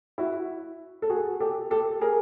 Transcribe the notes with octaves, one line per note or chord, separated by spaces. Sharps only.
E4 F#4
A4
F#4 G#4
G4 A4
G4 A4
G#4 A#4